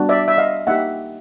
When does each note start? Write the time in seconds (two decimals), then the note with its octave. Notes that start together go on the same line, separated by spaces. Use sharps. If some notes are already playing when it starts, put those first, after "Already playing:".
Already playing: G3 B3 D4 F#4
0.09 D5 E5
0.28 E5
0.38 D#5 F5
0.67 A#3 D#4 G4 E5 F#5